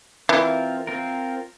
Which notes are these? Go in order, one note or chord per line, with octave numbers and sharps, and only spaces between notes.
E3 C4 F4 A#4
C4 F4 A#4